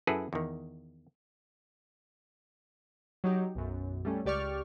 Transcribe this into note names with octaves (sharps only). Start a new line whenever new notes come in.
F#2 E4 G#4 A4 B4
E2 D#3
F#3 D#4 G4
B1 F#2
G3 A3 C#4
C#2 G4 D5 C#6 F6